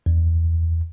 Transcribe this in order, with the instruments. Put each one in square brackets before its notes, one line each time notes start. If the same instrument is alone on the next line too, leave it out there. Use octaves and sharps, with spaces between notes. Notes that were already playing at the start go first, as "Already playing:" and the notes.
[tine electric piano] E2